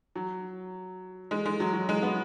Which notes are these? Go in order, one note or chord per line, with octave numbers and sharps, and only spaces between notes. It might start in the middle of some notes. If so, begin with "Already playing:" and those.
F#3
G#3
G#3
F#3
F#3
G#3
B3